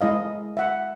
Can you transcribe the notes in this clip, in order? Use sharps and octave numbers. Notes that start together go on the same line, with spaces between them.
G#3 E4 D#5 F5
E5 F#5